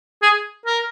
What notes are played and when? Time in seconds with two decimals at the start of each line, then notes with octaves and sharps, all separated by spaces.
0.22 G#4
0.65 A#4